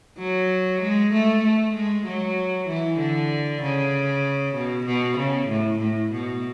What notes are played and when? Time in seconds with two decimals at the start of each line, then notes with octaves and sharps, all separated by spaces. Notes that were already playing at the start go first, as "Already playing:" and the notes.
0.18 F#3
0.82 G#3
1.13 A3
1.44 A3
1.74 G#3
2.06 F#3
2.68 E3
2.99 D3
3.61 C#3
4.55 B2
4.86 B2
5.18 C#3
5.49 A2
5.79 A2
6.12 B2